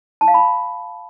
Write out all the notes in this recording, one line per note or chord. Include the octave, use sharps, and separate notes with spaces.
A5
F5
B5